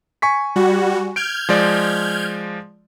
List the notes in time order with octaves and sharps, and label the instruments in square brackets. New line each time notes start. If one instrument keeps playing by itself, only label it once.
[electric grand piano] G#5 C#6 B6
[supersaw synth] G3 F#4
[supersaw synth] F6 G6 G#6 [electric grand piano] D7
[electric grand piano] F3 G#3 D5